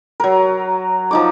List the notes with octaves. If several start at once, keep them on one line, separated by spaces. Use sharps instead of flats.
F#3 A#4
F3 D#4 D6